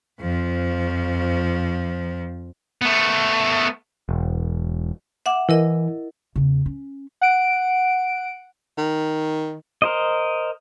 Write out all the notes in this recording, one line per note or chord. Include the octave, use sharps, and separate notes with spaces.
F2 F3
A3 B3
E1
E5 F#5 D6
E3 E4 A#4 D#5
E2 C#3
C#4
F#5 D7
D#3
A#4 C5 D#5